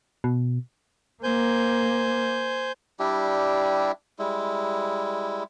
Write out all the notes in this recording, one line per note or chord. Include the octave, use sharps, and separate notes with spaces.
B2
A#3 C5 G#5 G6
G3 D4 E4 G4
G3 G#3 E4